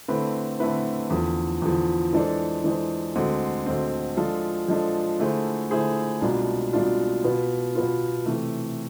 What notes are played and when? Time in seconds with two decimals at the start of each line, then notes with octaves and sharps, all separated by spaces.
0.08 D3 A3 C4 E4 B4
0.60 D3 A3 C4 E4 B4
1.10 E2 D3 F3
1.62 E2 D3 F3
2.13 E3 G#3 D4 A4 C5
2.64 E3 G#3 D4 A4 C5
3.15 D2 D3 G#3 C4
3.66 D2 D3 G#3 C4
4.17 F3 G#3 D4 F4 A4
4.68 F3 G#3 D4 F4 A4
5.19 D3 A3 E4 G#4 C5
5.71 D3 A3 E4 G#4 C5
6.21 C2 B2 G#3 D4 F4
6.73 C2 B2 G#3 D4 F4
7.24 B2 B3 F4
7.75 B2 B3 F4
8.26 C3 E3 A3